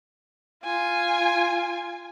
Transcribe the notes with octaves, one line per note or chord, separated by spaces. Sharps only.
F4 G#5